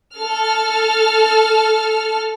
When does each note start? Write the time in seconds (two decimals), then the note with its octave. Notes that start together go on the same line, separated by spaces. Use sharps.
0.15 A4 F6